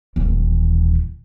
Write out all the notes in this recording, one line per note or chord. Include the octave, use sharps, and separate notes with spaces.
D#1 E3